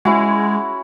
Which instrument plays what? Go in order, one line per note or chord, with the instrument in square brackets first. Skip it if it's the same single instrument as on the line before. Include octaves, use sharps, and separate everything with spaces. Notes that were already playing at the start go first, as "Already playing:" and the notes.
[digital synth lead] G#3 [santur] C#4 E4 F#4